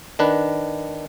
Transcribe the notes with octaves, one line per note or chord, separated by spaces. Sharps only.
D#3 D4 B4